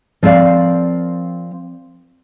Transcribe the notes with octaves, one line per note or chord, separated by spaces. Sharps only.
F3 C4 A#4 D5 F5